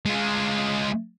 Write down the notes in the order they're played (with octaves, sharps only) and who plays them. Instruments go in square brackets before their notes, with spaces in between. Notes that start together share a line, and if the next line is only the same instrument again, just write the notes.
[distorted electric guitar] G#3 F4